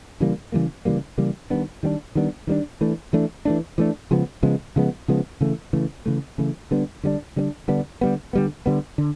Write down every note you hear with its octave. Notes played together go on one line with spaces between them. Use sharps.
C#3 E3 G3 A#3
C#3 E3 G3 A#3
C#3 E3 G3 A#3
C#3 E3 G3 A#3
D#3 G3 B3 D4
D#3 G3 B3 D4
D#3 G3 B3 D4
D#3 G3 B3 D4
E3 A3 D4
E3 A3 D4
E3 A3 D4
E3 A3 D4
C#3 F3 G#3 B3
C#3 F3 G#3 B3
C#3 F3 G#3 B3
C#3 F3 G#3 B3
C#3 E3 A3
C#3 E3 A3
C#3 E3 A3
C#3 E3 A3
D3 G3 B3 D4
D3 G3 B3 D4
D3 G3 B3 D4
D3 G3 B3 D4
D3 G3 B3
D3 G3 B3
D3 G3 B3
D3